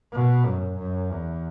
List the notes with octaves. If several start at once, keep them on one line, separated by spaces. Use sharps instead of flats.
B2
F#2
F#2
E2